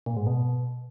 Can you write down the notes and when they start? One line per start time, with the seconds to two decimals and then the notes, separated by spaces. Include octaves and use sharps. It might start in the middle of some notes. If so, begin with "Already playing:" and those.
0.06 A#2
0.17 G#2
0.27 B2